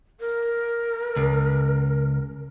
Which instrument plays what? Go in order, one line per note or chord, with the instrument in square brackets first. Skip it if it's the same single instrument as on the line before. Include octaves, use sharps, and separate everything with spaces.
[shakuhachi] A#4
[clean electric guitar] C#2